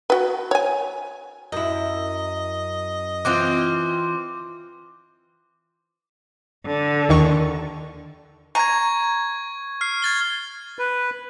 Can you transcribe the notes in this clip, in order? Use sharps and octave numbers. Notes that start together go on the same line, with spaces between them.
F#4 B4
C#5 G#5
F#2 E4 D#5
E3 C4 F4 D6
D3
D#2 D#3 C#6
A#5 C#6 G#6
F6 C7
G#6 A6 G7
B4